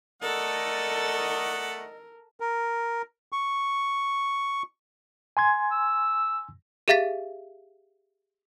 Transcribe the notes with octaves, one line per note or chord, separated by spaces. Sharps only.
A3 A4 A#4 D5 D#5 F#5
A#4
C#6
G#5 C6 G#6
E6
G4 G#4 E5 F5 A6 B6